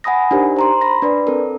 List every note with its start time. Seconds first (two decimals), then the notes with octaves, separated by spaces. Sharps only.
0.04 F#5 G#5 B5 D#6 A#6
0.31 D4 D#4 G4 A#4 C5
0.56 C5 A#5 C6
0.81 B5 A#6
1.02 D4 B4 D5
1.27 C4 A4 A#4